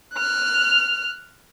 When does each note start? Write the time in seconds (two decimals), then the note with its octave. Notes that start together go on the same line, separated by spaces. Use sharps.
0.13 F6 F#6